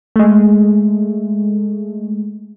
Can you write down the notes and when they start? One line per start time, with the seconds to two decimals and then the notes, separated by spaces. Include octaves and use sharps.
0.16 G#3 A3